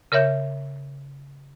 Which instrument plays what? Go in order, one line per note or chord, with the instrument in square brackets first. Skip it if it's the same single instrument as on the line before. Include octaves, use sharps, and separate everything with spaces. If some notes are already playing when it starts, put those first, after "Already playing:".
[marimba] C#3 A#4 C#5 E5 G6